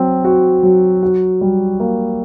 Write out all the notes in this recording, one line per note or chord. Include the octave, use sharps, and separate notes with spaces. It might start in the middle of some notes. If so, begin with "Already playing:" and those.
Already playing: F#3 C4
F#4
F#3
F#4
G3
A#3